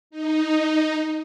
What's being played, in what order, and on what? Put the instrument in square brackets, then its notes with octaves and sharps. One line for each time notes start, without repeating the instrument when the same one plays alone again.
[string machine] D#4